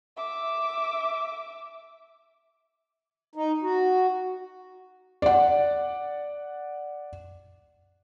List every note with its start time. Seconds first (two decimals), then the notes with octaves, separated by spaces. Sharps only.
0.17 E5 D6
3.35 D#4
3.63 F#4
5.22 D5 F#5